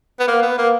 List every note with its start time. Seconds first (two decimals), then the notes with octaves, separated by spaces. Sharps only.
0.20 B3
0.28 A#3
0.43 B3
0.58 A#3